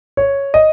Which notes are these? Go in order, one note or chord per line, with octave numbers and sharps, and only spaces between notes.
C#5
D#5